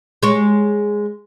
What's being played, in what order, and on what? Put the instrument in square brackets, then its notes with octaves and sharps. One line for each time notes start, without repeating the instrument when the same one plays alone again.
[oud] G#3 C#5